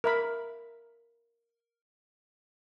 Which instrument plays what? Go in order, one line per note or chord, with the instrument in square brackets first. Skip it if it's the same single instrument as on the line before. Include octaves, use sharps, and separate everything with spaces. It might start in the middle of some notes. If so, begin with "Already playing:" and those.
[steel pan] A#4 E5 B5